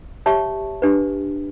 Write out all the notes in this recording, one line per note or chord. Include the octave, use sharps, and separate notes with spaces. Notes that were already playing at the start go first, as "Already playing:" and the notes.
G4 C#5 E5 A5 C#6
D4 G4 B4